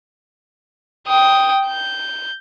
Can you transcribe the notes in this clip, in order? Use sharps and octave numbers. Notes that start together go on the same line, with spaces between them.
G5 D#6
G6